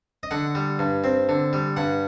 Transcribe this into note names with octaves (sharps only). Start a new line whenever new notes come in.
D#5
D3 F#5
G3
G2
C4
D3
G3
G2 F#5